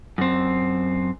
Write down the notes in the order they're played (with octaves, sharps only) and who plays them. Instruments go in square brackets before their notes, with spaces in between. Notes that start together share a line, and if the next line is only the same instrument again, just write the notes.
[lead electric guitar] F#2 C4